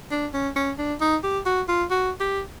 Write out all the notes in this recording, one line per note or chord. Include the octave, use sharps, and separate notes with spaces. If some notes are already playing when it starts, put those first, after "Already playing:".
D4
C#4
C#4
D4
D#4
G4
F#4
F4
F#4
G4